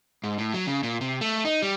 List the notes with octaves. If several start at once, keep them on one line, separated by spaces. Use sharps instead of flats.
G#2
A2
F#3
C#3
A#2
C3
A3
D#4
G3